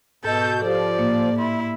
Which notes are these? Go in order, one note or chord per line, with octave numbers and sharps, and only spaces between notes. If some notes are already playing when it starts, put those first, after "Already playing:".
G#2 B2 A4 D#5 G6
F3 G4 A4 D5
A2 A#3
E4 C6